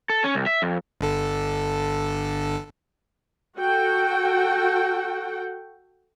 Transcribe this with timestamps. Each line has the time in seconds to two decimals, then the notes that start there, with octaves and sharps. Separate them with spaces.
0.09 A4
0.24 C#4
0.35 C2
0.46 E5
0.62 F2
1.01 G1 D3 A4
3.57 F#4 A4 F#5 G5